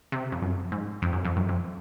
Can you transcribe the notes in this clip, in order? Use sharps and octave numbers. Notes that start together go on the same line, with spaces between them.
C3
F2
F#2
G#2
F2
F#2
F2
F#2
F2